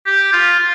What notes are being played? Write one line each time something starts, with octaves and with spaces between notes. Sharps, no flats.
G4
F4
F4